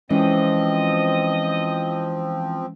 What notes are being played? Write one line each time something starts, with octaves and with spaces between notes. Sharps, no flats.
E3 F3 G#3 C4 C#4 D#5